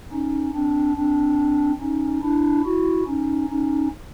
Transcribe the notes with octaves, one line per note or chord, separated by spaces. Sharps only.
C#4 D#4
C4 D4
C4 D4
C#4 D#4
D4 E4
E4 F#4
C#4 D#4
C#4 D#4